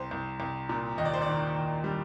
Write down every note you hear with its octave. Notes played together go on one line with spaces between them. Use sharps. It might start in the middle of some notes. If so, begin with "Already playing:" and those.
Already playing: C2 C5
C2
C2
A#2
D#2 D#5
D5
C5
D#3 D5
D#2
G3